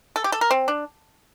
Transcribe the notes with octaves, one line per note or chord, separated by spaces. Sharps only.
A4
G4
A4
A#4
C4
D4